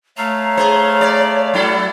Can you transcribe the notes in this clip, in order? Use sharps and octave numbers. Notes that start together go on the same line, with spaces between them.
A3 C#5 F5 A#5
G#4 C5
D5
F#3 E4 A4